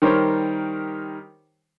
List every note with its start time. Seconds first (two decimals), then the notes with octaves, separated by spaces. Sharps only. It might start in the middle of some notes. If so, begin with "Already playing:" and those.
0.02 D#3 G3 G4 A#4 C5 C#5